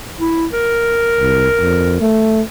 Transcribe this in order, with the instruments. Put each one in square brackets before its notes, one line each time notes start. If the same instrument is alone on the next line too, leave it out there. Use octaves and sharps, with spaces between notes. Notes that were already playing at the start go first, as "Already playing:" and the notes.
[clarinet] E4
A#4
[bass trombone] C2
F2
A3